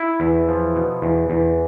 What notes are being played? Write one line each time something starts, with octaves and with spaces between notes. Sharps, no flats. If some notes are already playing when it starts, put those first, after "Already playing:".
Already playing: E4
E2
F3
B2
E2
E2